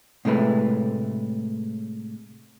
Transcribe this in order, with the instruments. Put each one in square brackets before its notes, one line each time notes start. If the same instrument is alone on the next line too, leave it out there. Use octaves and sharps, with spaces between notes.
[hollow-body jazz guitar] A2 C3 G#3 A3 B4